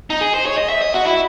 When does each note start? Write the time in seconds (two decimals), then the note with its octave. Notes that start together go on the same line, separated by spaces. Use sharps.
0.10 D#4
0.21 G#4
0.34 C5
0.45 C#5
0.57 D#5
0.69 E5
0.81 D#5
0.94 F#4
1.05 E4